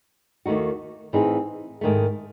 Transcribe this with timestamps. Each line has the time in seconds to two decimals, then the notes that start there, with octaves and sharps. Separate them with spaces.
0.46 D#2 D#3 A3 D#4 F#4
1.13 A2 E3 C4 D#4 G#4
1.81 G#2 D#3 A3